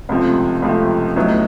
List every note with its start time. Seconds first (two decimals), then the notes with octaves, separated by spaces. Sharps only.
0.09 C#2 C3 F3 A3 C4
0.62 C#2 C3 F3 A3 C4
1.16 A2 F#3 B3 D#4